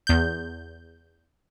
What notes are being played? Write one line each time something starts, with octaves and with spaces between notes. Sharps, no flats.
E2 G6